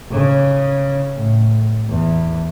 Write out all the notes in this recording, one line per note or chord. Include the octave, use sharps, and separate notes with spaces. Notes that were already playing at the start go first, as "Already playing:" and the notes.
C#3
A2
E2